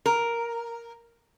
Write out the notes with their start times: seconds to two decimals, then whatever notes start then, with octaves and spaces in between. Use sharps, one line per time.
0.06 A#4